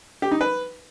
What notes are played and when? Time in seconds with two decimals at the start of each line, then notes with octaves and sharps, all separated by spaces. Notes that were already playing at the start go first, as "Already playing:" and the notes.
0.22 G4
0.31 D#4
0.41 B4